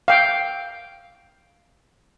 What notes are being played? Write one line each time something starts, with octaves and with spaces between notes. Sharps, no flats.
F5 G5